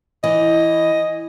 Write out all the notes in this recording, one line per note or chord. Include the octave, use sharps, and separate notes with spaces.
E3 D#5